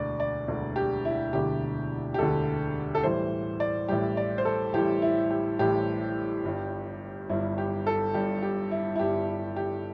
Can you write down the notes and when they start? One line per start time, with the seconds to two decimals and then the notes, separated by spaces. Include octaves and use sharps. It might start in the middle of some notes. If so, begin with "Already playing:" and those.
Already playing: E1 D2 D3 D5
0.20 D5
0.48 E1 D2 D3
0.76 G4
1.05 E4
1.33 E1 D2 D3 G4
2.14 G4
2.18 E1 D2 D3 A4
2.95 A4
3.03 A1 A2 E3 G3 C5
3.60 D5
3.88 A1 A2 E3 G3 G4
4.17 D5
4.38 C5
4.45 A4
4.73 A1 A2 E3 G3 G4
5.02 E4
5.30 G4
5.59 A1 A2 E3 G3 G4
6.45 G1 G2 G3
7.29 G1 G2 G3 E4
7.58 G4
7.87 A4
8.14 G1 G2 G3 G4
8.42 G4
8.71 E4
8.96 E4
8.99 G1 G2 G3 G4
9.56 G4